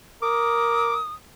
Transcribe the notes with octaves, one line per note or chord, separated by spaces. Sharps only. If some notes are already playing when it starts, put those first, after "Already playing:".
A#4 D6 D#6